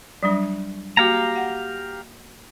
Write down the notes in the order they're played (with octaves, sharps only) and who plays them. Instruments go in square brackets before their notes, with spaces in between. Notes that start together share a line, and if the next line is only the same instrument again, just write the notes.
[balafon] F#3 G3 D4
[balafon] A#3 F#4 [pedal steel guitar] G4 F5 A#5
[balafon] F#5